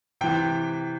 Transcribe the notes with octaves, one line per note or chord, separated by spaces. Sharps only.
C3 E3 G5